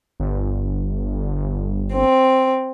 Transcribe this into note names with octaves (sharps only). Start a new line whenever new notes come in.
G1
C4